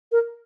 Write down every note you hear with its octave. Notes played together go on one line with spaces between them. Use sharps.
A#4